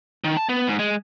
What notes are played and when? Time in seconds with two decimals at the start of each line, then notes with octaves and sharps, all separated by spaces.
0.24 D#3
0.37 A5
0.49 B3
0.68 G#2
0.79 G#3